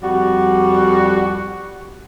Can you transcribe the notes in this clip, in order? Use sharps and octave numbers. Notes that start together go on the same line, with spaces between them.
F2 G3 F#4